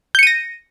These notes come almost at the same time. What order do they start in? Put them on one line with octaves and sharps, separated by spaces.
G6 C#7 D#7 A#6